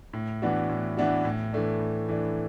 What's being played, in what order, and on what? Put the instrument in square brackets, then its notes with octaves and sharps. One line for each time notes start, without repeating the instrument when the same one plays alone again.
[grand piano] A2
E3 B3 D4 F#4
A2
E3 B3 D4 F#4
A2
E3 A3 D4
A2
E3 A3 D4